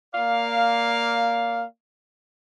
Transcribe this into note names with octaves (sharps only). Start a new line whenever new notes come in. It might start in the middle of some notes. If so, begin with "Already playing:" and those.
A#3 D5 F5